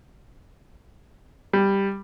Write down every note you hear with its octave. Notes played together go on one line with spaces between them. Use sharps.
G3